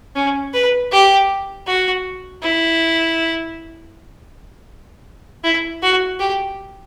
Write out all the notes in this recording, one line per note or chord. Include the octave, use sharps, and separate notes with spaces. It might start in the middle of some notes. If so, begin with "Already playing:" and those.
C#4
B4
G4
F#4
E4
E4
F#4
G4